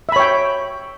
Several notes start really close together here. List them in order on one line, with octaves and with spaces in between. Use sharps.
E5 B5 C#5 G5